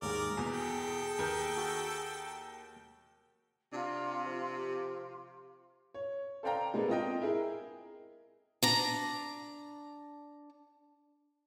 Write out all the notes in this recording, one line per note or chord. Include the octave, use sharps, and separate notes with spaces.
D#2 G#2 G#4 A#4 D5
E2 B2 G#5
A4 G5
D#2 A#4 G6
F#4
C3 D4 F4
F3 F4
G4
C#5
A4 C5 D5 F5 G5 A#5
G#3 A#3 B3 D4 A4
C4 F4 D#5 G5
E4 G#4 A#4
D4 A#5